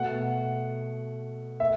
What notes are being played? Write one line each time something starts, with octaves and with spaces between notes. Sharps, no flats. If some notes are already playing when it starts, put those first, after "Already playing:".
Already playing: B2 A3 F#5
A3 E5